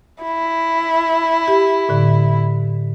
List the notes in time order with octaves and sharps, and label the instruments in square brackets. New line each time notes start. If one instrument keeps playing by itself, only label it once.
[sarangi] E4
[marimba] G4
A2 D3